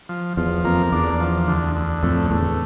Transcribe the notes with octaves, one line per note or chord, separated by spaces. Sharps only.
F3
E2 F3
F2 A#3
E2 D4
F3
D2
D2
F2 A2
E2 A2